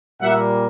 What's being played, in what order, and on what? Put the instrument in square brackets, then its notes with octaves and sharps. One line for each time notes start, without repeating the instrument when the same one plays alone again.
[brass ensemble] A#2 G3 A#3 E5 F#5